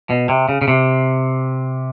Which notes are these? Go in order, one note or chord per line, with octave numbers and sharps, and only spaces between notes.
B2
C3
C#3
C#3
C3